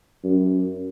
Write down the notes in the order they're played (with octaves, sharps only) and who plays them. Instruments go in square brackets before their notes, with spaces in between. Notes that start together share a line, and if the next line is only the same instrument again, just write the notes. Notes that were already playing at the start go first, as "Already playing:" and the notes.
[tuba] F#2